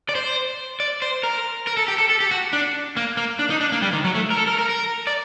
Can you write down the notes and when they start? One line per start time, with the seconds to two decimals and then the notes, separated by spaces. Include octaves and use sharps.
0.09 D5
0.15 C5
0.80 D5
1.02 C5
1.23 A#4
1.67 A#4
1.77 A4
1.88 G4
1.98 A4
2.10 A4
2.20 G4
2.31 F#4
2.53 D4
2.97 A#3
3.17 A#3
3.39 D4
3.50 D#4
3.61 D4
3.72 A#3
3.82 G3
3.93 D#3
4.04 F#3
4.15 A3
4.30 A#4
4.37 A4
4.47 A#4
4.58 A#4
4.69 A#4
5.07 D5